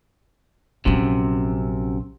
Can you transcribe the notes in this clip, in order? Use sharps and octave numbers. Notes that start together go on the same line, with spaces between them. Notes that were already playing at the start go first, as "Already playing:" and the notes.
A#1 F#2 C3 C#4